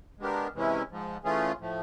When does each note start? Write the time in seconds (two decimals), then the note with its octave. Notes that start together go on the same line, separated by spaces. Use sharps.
0.19 G#3 B3 D4 G4 A#4
0.54 C3 E3 G#3 C#4 E4
0.90 G#2 F3 G#3
1.24 E3 A3 C#4 F4 G#4
1.59 A2 F3 A3